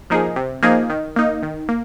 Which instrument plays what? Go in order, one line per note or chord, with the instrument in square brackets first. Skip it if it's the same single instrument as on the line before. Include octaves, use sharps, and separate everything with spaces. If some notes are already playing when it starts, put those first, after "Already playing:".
[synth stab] F3 A#3 D#4 G#4
C3
F3 A#3 D#4 G#4
D#3
A#3 D#4
D#3
A#3